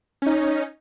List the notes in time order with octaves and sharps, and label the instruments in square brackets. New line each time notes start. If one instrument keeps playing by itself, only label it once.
[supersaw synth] C#4 D#4